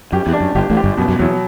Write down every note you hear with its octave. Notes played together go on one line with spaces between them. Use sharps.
F#2 G4
E2
D4
F#2
G1 G2 G4
A1 A2
G4
G1 G2
F#2 B2
F#2
E2 F#3